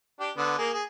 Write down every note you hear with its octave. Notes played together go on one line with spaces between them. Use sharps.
D4 G4
D3 B3
A#3 G#4
G#4